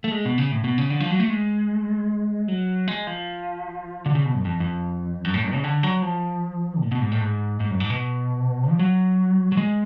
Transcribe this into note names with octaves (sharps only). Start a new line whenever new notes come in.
A3
G#3
B2
C#3
A2
B2
C#3
D3
F3
F#3
A3
G#3
F#3
G#3
F3
D3
C#3
B2
F#2
F2
F2
F#2
A2
F#2
C#3
D3
F#3
F3
A2
B2
G#2
A2
G#2
G#2
F#2
G#2
B2
F3
F#3
F#3
G#3